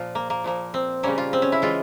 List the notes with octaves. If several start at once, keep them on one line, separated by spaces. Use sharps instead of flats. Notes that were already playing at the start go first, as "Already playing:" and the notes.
Already playing: A#2 F3 F4
A#3
A#3
A#2 F3 A#3
C4
C#3 G3 A#3 C#4
F4
C4
C#4
E4
E3 G#3 F4